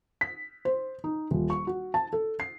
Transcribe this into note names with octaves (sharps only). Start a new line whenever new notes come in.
B6
C5
D#4
D#1
C#6
F#4
A5
A4
C7